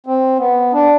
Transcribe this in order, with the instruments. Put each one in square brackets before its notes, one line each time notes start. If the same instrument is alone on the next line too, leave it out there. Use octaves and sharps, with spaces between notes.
[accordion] C4
B3
D4